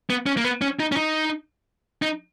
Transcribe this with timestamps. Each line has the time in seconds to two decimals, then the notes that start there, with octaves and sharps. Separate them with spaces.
0.10 B3
0.26 C#4
0.37 A#3
0.44 B3
0.62 C#4
0.80 D#4
0.92 C#4
0.97 D#4
2.02 D#4